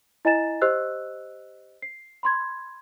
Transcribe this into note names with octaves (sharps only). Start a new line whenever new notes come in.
E4 D#5 G#5 A#5 A6 E7
G4 C5 D#5 E6 F#6
C7
B5 C6 G#6